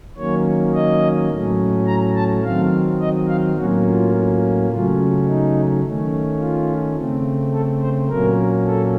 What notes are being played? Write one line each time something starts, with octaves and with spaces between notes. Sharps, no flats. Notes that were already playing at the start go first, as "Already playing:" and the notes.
D#3 F#3 A#3 C#4 C#5
D#5
A2 F#3 A3 C#4
A#5
A5
D#3 F#3 C4 F5
D#5
F5
A2 F#3 A#3 C#4 F#4
F4
C#3 F#3 A3 C#4 F4
D#4
D#3 A3 C#4
F4
C#3 A3 C4
A4
C5
A#2 F#3 A#3 C#4 A#4
A4